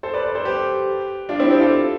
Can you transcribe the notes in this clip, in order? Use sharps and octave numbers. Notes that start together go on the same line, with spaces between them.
A4 C5
B4 D5
B4 D5
A4 C5
G4 B4
D4 F4
C4 E4
E4 G4
F4 A4